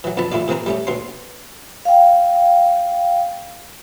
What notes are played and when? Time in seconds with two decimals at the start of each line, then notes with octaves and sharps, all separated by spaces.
0.04 E3 F#3
0.17 F2 B2 D3 A5 B5
0.32 A2 D#3 E4 F4 D5
0.48 C3 E3 A#3 C4 A#4
0.66 G3 A3 C#4
0.87 D2 B2 C#4 C6
1.85 F5 G5